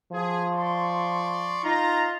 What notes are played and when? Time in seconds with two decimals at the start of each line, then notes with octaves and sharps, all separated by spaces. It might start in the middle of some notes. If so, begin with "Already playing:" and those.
0.12 F3 G#4
0.53 D5 C6 C#6
1.64 D#4 F4 A#5